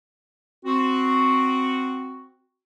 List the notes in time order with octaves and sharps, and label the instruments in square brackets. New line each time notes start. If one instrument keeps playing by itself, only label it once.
[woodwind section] C4 F#4